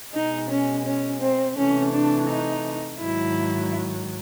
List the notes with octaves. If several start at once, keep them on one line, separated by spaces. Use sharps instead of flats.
B2 G#3 D#4
C#4
C#4
C4
C3 E3 A3 C#4
D4
D#4
G#2 D#3 F#3 E4